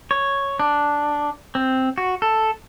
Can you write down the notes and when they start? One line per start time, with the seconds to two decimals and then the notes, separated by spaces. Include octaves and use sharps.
0.11 C#5
0.60 D4
1.55 C4
1.98 F#4
2.22 A4